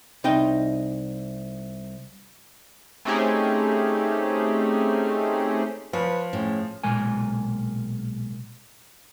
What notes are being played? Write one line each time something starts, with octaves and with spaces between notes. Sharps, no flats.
C2 D#4 D#5 G5
A3 C4 C#4 D#4 G4 G#4
F3 B4 C#5
A2 G#3 C#4
B1 A#2 G#3 A#4 G#5